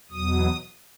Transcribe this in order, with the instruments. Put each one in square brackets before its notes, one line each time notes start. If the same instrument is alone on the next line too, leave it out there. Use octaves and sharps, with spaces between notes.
[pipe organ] E2 B2 F#3 D#6